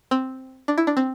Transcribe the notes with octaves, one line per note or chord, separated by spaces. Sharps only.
C4
D4
E4
D4
C4